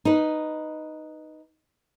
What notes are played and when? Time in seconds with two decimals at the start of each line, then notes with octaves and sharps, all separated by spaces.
0.05 D#4 B4